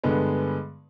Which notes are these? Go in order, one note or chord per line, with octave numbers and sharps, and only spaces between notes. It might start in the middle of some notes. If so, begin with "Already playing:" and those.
G2 D3 G#3 B3